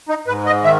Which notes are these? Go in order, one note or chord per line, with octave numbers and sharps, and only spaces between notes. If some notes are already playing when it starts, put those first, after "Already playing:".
D#4
G#2 B4
D#5
D#3 E5